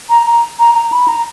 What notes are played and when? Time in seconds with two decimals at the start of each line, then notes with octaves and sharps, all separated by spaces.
0.10 A#5
0.27 A#5
0.59 A#5
0.75 A#5
0.92 B5
1.08 A#5